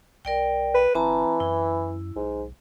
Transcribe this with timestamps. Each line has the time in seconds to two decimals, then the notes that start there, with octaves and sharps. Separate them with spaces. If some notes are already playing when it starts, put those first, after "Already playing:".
0.25 B1 A#4 D5 G5
0.74 B4
0.95 G1 E3 C4 A5 A#5
1.40 F#2 E4
2.16 B1 G#2